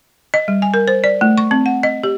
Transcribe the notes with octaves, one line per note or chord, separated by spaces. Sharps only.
D#5
G3
G#5
A#4
C5
D5
A3
C#6
C4
F#5
D#5
G4